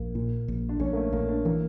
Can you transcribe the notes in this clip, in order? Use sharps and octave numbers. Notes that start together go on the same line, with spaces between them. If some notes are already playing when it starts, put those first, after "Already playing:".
Already playing: A#1 A#3
A#2
A#1
D4
A#1 C#4
A#3
A3
A#1 A#3
D4
E3 A#3